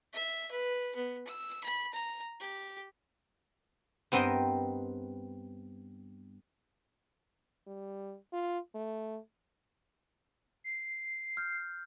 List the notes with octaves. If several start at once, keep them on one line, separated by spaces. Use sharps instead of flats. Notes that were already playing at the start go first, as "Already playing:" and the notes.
E5
B4
B3
E6
B5
A#5
G4
G2 B3 C4 A#4 D#5 G5
G3
F4
A3
C7
F6 G6